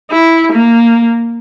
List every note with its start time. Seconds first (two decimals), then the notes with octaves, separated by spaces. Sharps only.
0.11 E4
0.53 A#3